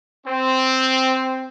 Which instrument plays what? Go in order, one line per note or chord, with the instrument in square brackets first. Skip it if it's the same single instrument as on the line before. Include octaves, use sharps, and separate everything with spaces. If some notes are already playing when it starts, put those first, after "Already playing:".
[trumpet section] C4